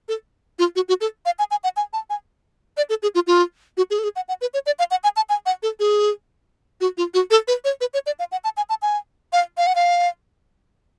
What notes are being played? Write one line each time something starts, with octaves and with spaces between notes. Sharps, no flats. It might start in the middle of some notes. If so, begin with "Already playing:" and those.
A4
F4
F#4
F#4
A4
F5
G#5
G#5
F#5
G#5
A5
G#5
D5
A4
G#4
F4
F4
F#4
G#4
A4
G#4
F#5
F#5
B4
C#5
D5
F5
F#5
G#5
A5
G#5
F#5
A4
G#4
F#4
F4
F#4
A4
B4
C#5
B4
C#5
D5
F5
F#5
A5
G#5
A5
G#5
F5
F5
F#5
F5